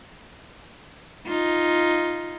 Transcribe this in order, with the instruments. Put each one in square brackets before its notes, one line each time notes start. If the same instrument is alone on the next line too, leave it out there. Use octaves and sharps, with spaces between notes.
[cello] D#4 F4